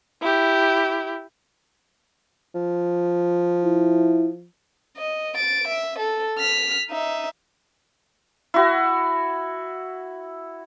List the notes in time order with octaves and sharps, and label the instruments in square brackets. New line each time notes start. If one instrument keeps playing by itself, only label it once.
[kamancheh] E4 G4
[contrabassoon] F3
[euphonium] E4
[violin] D#5
A6 D7
E5
A4
F6 B6
D#4 E5
[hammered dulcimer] E4 F#4